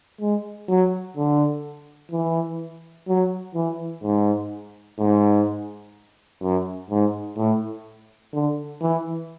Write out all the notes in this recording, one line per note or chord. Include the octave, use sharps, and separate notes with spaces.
G#3
F#3
D3
E3
F#3
E3
G#2
G#2
F#2
G#2
A2
D3
E3